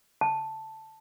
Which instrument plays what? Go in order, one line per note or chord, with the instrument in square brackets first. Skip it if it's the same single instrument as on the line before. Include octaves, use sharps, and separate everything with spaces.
[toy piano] A5